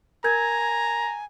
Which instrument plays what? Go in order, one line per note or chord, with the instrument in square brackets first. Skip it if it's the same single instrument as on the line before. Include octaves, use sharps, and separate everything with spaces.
[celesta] A#4 G6 G#6 [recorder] G#5 [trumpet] A#5